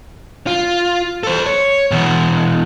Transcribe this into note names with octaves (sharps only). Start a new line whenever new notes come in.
F4
A4 C5
C#5
E2 B2